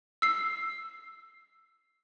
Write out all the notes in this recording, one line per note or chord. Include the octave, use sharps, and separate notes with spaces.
E6 C7